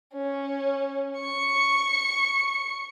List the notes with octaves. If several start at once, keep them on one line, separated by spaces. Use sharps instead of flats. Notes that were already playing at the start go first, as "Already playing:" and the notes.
C#4
C#6 C#7